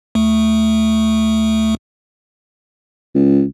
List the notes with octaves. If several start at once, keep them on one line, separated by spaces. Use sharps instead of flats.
D2 A3
C#2